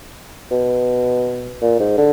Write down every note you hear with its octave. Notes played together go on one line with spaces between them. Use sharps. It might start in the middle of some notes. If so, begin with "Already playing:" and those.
B2
A#2
G#2
D3